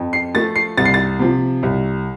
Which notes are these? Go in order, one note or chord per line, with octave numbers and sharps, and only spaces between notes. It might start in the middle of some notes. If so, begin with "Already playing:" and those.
Already playing: F2
C7
F3 A3 A6
C7
C2 A6
C7
A6
C3 F3
C2